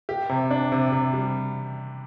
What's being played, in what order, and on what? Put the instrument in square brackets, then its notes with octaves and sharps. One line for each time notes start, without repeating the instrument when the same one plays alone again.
[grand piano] G4
C3
D4
C3
C3
G3